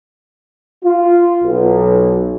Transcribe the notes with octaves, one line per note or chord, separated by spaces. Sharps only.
F4
B1